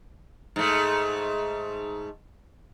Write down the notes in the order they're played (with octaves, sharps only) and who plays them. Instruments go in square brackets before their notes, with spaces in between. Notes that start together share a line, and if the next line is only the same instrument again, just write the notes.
[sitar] G#2 A3